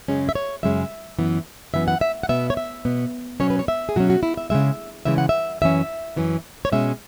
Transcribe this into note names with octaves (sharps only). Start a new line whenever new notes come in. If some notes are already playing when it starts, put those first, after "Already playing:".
F#2 C#3 G#3 C#4
E5
C#5
F#2 C#3 G#3 C#4 E5
F#2 E3 B3
F#2 E3 B3 E5
F#5
E5
F#5
B2 B3 E5
C#5
E5
B2 B3
B2 F#3 C#4 C#5
B4
C#5
E5
G#4
B2 F#3 C#4 F#4
F#4
E4
E5
C#3 E3 G#3 E5
C#3 E3 G#3 E5
F#5
E5
F#2 E3 C#4 E5
F#2 E3 C#4
C#5
B2 G#3 C#4 E5